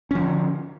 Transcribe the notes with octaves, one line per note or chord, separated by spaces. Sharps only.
D3 F3 C#4